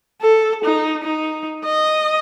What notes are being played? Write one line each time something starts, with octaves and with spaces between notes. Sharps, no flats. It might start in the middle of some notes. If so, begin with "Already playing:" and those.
A4
D#4
D#4
D#5